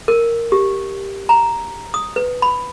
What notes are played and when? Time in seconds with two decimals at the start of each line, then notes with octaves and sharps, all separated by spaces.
0.08 A#4
0.52 G4
1.29 A#5
1.94 D#6
2.16 B4
2.42 B5